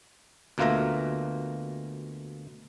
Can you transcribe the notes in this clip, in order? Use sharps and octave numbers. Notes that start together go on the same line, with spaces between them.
D2 B2 A#3 F4 E5 A#5